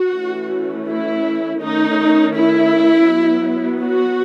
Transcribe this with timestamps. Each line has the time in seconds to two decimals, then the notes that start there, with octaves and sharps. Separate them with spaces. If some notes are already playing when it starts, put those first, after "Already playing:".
Already playing: F#4
0.13 E3 A3 C#4
0.87 E4
1.60 D#3 A3 C#4 D#4
2.33 E4
3.06 F#3 B3
3.80 F#4